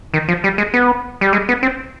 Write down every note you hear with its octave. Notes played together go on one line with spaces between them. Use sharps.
D#3
F3
G3
G#3
B3
G3
G#3
B3
C4